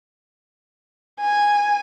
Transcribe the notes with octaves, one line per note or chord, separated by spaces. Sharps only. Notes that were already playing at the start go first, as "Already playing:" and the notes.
G#5